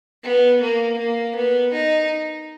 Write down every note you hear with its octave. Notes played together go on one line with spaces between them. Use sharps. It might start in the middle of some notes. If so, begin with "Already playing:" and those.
B3
A#3
A#3
B3
D#4